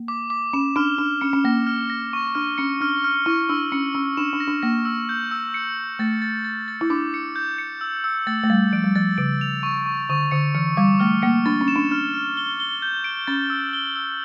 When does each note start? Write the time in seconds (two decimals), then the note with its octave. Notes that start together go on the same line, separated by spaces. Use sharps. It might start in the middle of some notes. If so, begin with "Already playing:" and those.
Already playing: A#3
0.08 D6
0.30 D6
0.53 C#4 E7
0.76 D4 F6
0.98 D4 F6
1.21 C#4 C#7
1.33 C#4
1.45 A#3 A#6
1.67 F6
1.90 A#6
2.13 C#6
2.35 D4 F6
2.58 C#4 C#7
2.81 D4 F6
3.04 F6
3.26 E4 C#6
3.49 D4 E6
3.72 C#4 C#7
3.95 C#4 E6
4.17 D4 E7
4.33 D4
4.40 A#6
4.48 D4
4.62 A#3 A#6
4.85 E6
5.09 G6
5.31 E6
5.54 C#7
5.77 E6
5.99 A3 A6
6.22 A6
6.44 A6
6.68 A6
6.81 E4
6.90 D4 D6
7.14 C#7
7.36 G6
7.58 C#7
7.81 E6
8.04 E6
8.27 A3 A6
8.43 A3
8.50 G3 A6
8.73 F3 D7
8.84 G3
8.95 F3 A6
9.18 C#3 D7
9.41 F7
9.63 C#6
9.86 C#6
10.09 D3 C#6
10.31 D3 C#7
10.55 E3 C#7
10.77 G3 D6
11.00 A3 F6
11.22 A#3 C#7
11.46 D4 A6
11.61 C#4
11.68 E7
11.76 D4
11.91 D4 F6
12.14 F6
12.37 G7
12.60 G7
12.82 G6
13.04 D7
13.27 C#4 A6
13.50 E6
13.73 G7
13.96 E6